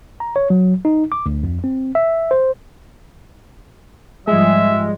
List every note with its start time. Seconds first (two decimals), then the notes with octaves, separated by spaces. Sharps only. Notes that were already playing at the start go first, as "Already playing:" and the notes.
0.20 A#5
0.36 C#5
0.50 F#3
0.85 D#4
1.12 D6
1.26 D2
1.43 F2
1.64 C4
1.95 E5
2.31 C5
4.27 G#2 F3 G3 G#3 E5